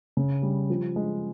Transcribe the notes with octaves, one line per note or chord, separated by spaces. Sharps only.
C#3
G3
F3
G#3